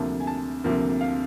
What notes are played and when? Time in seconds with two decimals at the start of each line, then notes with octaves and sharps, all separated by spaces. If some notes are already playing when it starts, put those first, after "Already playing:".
Already playing: D2 C3 F3 A#3 A5
0.20 G#5
0.27 A5
0.64 D2 C3 F3 A#3
1.01 F5